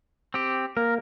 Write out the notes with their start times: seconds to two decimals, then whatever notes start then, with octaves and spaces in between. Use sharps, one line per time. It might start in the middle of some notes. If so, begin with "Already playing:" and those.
0.34 C4 G4
0.77 A#3 A#4